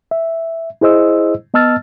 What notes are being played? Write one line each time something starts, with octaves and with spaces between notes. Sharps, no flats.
E5
E4 G#4 C5 D#5 E6
B3 D#5 A5 E6 F6 A6